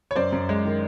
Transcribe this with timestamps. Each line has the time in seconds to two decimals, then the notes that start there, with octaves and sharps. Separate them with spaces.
0.11 C#5
0.16 F#2 C5 D5
0.32 F#2
0.49 G#3
0.65 D#3